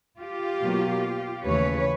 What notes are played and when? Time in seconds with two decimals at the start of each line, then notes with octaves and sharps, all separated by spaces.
0.19 F4 G4
0.62 B2 F#3 A#3
1.45 D#2 C#3 E3 A3 C#4 B4 C#5